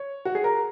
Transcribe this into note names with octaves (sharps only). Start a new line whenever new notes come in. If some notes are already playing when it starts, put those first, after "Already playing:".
Already playing: C#5
F#4
G#4
A#4